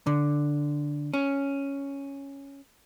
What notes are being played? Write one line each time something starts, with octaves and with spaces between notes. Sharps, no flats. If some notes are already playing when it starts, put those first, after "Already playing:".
D3
C#4